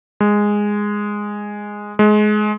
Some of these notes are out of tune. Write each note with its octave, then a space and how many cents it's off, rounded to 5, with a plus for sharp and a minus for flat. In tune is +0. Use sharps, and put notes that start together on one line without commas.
G#3 -5
G#3 +25